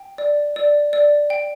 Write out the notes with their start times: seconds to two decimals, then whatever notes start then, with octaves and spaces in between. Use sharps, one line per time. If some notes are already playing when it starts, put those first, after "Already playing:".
Already playing: G5
0.18 D5
0.56 D5
0.93 D5
1.30 G5